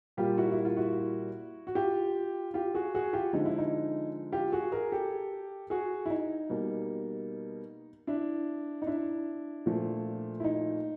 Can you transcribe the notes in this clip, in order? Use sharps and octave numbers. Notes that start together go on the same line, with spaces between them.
A#2 G3 A#3 F4 G4
E4 F#4
E4
F4
E4 F#4
F#4
F4 G4
F4 G4
F#4 G#4
F#4 G#4
F4 G4
D3 F3 G#3 D#4
E4
D#4
F4 G4
F#4 G#4
G#4 A#4
G4 A4
F#4 G#4
E4
D#4
B2 G3 A#3
D4 E4
D#4
D4 E4
A#2 F3 A3
E4
D#4